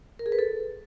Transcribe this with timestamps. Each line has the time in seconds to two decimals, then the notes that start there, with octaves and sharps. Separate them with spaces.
0.19 A#4
0.26 G#4
0.32 B4
0.39 A4